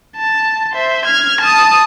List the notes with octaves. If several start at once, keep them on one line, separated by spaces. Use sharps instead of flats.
A5
C5 E5
F6 G#6
A5 D#6